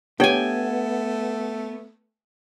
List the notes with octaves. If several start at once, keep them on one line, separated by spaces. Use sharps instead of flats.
A3 B3 D4 G4 C#5 G5 G#5